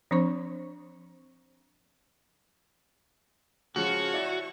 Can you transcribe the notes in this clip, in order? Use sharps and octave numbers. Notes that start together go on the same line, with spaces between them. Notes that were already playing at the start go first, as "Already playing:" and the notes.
F3 C4 D4 C5 C#6
C#3 F3 G#3 F#4 C#5 C#6
E4 D5